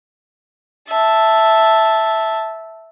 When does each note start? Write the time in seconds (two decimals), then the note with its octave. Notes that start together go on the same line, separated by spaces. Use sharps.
0.89 E5 A5